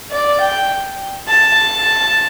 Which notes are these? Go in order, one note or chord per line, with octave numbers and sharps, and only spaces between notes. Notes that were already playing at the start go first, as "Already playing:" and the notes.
D5
G5
A5